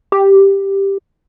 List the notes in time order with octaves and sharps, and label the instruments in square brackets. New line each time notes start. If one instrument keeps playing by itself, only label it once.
[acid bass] G4